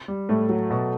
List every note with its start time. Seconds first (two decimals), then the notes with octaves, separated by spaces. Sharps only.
0.08 G3
0.29 A2 A3
0.49 F#3
0.70 B2